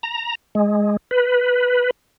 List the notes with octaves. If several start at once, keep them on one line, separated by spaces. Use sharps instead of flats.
A#5
G#3
B4